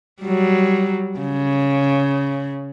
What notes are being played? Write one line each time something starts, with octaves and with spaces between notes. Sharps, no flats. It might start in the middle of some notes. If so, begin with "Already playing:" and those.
F#3 G3
C#3